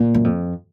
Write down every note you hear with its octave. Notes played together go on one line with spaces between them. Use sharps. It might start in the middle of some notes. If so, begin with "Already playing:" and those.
Already playing: A#2
F#2
F2